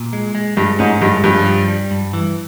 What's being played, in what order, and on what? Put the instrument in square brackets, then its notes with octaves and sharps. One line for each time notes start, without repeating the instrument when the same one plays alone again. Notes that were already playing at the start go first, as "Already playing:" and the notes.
Already playing: [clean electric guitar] A#2
G#3
G#3
[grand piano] G2 [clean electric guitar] G#3
[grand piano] G#2 [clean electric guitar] C#4
[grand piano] G2 [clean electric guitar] G#3
[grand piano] G2 [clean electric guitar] F3
[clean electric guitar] G3
G3
G2
E3